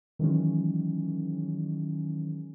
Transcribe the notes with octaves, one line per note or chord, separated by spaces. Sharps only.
D#3 E3 F#3 G#3 C#4